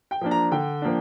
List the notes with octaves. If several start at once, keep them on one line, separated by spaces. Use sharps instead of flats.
G5
F3 A#3 D4
A#5
D3 G5
F3 A#3 D4